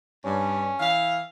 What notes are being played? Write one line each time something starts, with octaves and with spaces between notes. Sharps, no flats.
G2 C#4
E3 F5